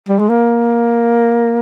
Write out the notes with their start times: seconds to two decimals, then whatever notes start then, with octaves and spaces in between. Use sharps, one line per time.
0.08 G3
0.19 G#3
0.29 A#3